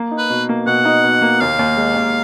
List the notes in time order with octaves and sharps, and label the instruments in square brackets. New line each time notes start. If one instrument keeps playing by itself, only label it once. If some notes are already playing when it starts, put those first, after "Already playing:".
Already playing: [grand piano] A#3
D#4
[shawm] B4
[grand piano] B2
A#3
[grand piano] B2 [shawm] F#5
[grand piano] D#4
B2
A#3
[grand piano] D#2 [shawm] F5
[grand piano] D#2
G#3
D#2